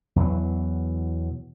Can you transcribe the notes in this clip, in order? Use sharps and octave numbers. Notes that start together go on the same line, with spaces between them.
E2 B2 E3 F#3